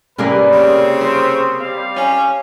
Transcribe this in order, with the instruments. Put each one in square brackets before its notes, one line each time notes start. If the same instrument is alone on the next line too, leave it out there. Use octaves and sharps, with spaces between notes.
[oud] C3 A#3 G#4 [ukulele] C#4 A#4 D5 [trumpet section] B4
[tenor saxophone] C#3 [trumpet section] C4
[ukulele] C5
[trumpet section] G3 F5
[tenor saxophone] C#4 [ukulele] G#5